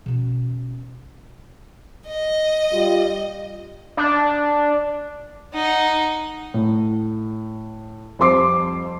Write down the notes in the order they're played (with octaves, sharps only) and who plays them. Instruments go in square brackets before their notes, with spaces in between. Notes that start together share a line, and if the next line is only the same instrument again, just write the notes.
[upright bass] B2 C#4
[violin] D#5
[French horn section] G3 F4
[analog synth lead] D4
[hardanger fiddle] D#4 F#5
[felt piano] A2
F2 G3 C5 C6 D6 C7